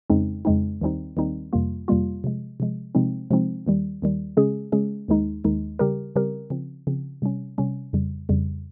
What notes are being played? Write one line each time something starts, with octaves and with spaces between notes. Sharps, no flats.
F2 C#3 G#3 C4 D#4
F2 C#3 G#3 C4 D#4
D#2 D#3 G3 C4 D#4
D#2 D#3 G3 C4 D#4
F2 C3 G3 A#3 F4
F2 C3 G3 A#3 F4
C3 F3 G#3
C3 F3 G#3
C3 F3 G#3 C4 D#4
C3 F3 G#3 C4 D#4
D#2 D#3 G3
D#2 D#3 G3
C#3 G#3 C#4 G#4
C#3 G#3 C#4 G#4
D#2 D#3 G#3 D#4
D#2 D#3 G#3 D#4
C#3 G3 C4 G4 A#4
C#3 G3 C4 G4 A#4
C#3 F3 C4
C#3 F3 C4
C3 G3 C#4
C3 G3 C#4
F2 C#3 G3
F2 C#3 G3